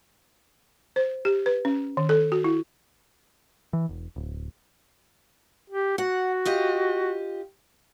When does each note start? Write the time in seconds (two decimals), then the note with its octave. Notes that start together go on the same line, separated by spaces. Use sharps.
0.96 C5
1.25 G4
1.46 B4
1.65 C#4
1.97 D#3
2.09 A4
2.32 F#4
2.44 E4
3.73 E3
3.89 E1
4.16 D1
5.70 G4
5.98 F#4 F#5
6.45 F4 G4 D#5